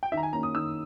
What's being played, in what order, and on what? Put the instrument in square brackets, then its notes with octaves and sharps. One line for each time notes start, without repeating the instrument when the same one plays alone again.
[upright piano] G5
[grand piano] D#3 [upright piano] E5
[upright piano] A#5
G#5
[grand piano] A#3 C#4 [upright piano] A#5
[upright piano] D#6
[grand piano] D#3 [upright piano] E6